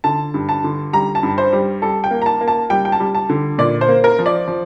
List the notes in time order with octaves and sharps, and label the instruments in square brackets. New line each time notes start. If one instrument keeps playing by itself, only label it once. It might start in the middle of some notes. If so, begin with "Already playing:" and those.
[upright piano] D3 A5
G2
A5
D3
G3 A#5
A5
G2
C5
G3
G3 A4
G5
A#3
A#5
A5
A#3
A5
G3 G5
G5
A5
G3
A5
D3
A#2 D5
C5
A#3
A#4
F3
D5
F3